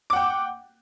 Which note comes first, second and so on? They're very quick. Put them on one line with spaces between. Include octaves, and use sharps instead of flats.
D6 F#5 G5